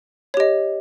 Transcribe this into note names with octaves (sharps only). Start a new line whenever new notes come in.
G4 C#5 D#5